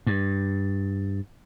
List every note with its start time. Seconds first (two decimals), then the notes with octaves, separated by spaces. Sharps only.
0.07 G2